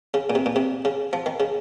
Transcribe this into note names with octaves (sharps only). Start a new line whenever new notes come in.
C#3
A#2
C3
A#2
C3
C#3
F3
D#3
C#3